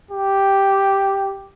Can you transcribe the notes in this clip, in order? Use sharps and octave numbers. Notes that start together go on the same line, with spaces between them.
G4